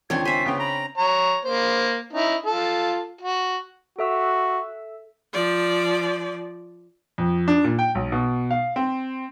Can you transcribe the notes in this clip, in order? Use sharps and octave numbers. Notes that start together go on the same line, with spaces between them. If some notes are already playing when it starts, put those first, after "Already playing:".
C#2 D#3 C4 D4 C#5 G#6
C5 E5 G#5 B6
C#3 B3 C#5 G5
A#5 B5
C#5 A#5
A#3 C5
C#4 D#4 E4
F4 A4
F#4
F#4 A4 E5 E6
F3 D5
F2
D4
A#2
G5
B1
B2
F5
C4